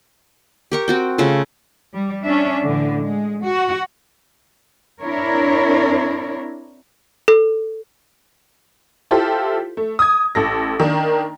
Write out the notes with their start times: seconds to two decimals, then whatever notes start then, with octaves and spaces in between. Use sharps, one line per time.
0.71 G4 A#4 C#6
0.88 C4 F#4 G5
1.18 C#3 A3 F4 A4
1.93 G3
2.23 C#4 D4 E5
2.65 A2 D3 E3
3.00 G#3
3.44 F#4
5.02 C4 D4 E4 A#4 C#5
7.28 A4
9.11 E4 F4 G4 A4 C5
9.77 A3
9.99 D#6 G#6
10.35 A1 A4 A#6
10.80 D#3 A#3 D4